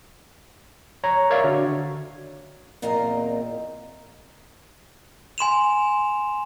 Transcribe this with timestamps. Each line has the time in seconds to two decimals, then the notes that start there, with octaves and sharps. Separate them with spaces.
1.04 C#5 A#5
1.30 A#4 C#5 D5 E5 F5
1.44 D3 F#4
2.82 E2 A#2 C4 D#5 F5 A#5
5.38 G#5 C6 E7 F7